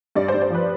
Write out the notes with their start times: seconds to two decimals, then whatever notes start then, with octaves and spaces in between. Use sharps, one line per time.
0.16 G2 D5
0.28 C5
0.34 G2
0.42 C5
0.50 F3 B4